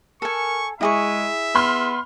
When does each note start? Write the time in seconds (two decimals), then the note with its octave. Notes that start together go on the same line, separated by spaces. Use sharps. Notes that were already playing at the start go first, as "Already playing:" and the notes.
0.22 A4 A#4 G#5 C#6
0.81 G#3 E4 G#4 E5 C#6
1.55 B3 B5 C6 F6